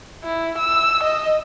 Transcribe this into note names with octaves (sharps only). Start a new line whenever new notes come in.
E4
E6
D#5